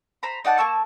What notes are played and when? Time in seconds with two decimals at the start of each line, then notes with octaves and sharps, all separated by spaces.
0.23 C5 A#5 B5
0.45 D#4 D5 F#5 A5
0.58 A#3 A5 C#6 E6